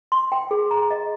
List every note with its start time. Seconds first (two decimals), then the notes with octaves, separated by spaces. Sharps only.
0.12 C6
0.32 G5
0.51 G#4
0.71 A#5
0.91 D#5